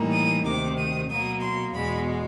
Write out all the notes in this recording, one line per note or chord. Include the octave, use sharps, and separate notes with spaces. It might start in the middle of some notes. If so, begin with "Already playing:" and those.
Already playing: A2 E3 G3 A#3 D#4
D#6
D2 C3 D#3 D6
D#6
B2 F#3 A#3 D#6
C6
E2 B2 G#3 B5